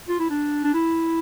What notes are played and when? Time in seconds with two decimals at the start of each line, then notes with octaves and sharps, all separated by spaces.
0.09 F4
0.19 E4
0.30 D4
0.64 D4
0.74 E4